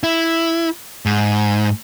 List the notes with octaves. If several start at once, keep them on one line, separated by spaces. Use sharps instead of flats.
E4
G#2